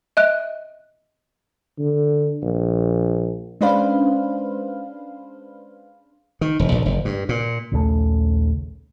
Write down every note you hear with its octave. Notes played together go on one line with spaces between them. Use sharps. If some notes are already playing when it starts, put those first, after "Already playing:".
D#5 E5 F#6
D3
A#1
G#3 C#4 D4 B4 C5 F5
D#3
E1
A#1
F#1
G2
A#2
A#1 D#2 C#3 A3